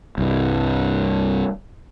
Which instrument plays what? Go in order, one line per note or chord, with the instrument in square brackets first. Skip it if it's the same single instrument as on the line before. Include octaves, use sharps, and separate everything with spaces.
[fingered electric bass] C2 G2